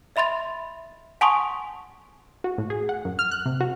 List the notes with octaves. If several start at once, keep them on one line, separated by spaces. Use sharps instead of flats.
D#5 E5 B5 C6 A6
F#5 G#5 A5 C6 C#6 D#6
F#4
A2
G#4
F#5
F#2
F6
F#6
C3
F#4